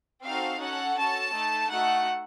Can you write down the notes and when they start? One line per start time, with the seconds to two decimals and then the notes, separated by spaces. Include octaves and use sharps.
0.24 C4 D#4 F#4 A4 F5
0.61 C#4 F#4 A4 F#5
0.97 C#4 F#4 A4 A5
1.34 A3 D#4 A4
1.70 A3 D#4 F#4 A4 F#5